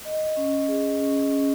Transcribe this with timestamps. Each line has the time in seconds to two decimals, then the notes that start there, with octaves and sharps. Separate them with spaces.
0.05 D#5
0.37 C#4
0.68 G#4
1.00 C#4
1.32 C#4